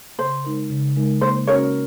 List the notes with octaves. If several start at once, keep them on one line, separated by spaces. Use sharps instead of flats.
C#3 C5
G#3 D#4 A#4
C#3
G#3 D#4 A#4
A#3 C5
C#4 F#4 A#4 C5 C#5